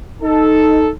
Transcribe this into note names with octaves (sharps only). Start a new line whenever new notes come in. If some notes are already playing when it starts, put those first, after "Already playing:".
D#4 A4